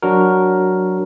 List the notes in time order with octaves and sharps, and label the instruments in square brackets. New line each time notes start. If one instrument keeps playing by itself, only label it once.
[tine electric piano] F#3 D4 F#4 A#4